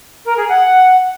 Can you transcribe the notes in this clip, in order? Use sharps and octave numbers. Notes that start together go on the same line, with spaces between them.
A#4
G#4
F#5